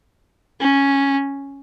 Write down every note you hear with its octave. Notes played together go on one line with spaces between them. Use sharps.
C#4